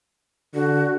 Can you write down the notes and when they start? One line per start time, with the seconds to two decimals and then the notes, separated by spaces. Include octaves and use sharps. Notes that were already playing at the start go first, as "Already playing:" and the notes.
0.54 D3 F#4